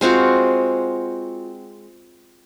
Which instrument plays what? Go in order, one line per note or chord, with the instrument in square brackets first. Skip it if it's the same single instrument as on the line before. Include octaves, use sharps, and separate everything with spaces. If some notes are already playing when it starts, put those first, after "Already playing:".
[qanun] G#3 C4 F4 F#4